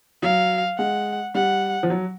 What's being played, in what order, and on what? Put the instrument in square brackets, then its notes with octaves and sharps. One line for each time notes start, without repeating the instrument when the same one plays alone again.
[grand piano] F#3 [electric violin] F5
[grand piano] G#3 [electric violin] F#5
[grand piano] G3 [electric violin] F#5
[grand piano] F3
F#3